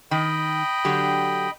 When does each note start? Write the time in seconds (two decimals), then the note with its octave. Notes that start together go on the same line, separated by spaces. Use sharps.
0.11 D#3 D#5 G5 B5
0.85 D3 F#3 G4